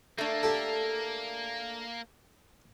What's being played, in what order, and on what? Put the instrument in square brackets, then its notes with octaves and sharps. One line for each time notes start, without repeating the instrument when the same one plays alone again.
[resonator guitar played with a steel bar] A3 D4 [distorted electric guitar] A#3
[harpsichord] G4 A4